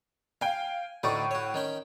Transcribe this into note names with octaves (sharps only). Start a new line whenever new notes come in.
F5 G5 G#5
D2 A2 D#4 D5 C#6
F#4 C#5
D#3 C#4 G5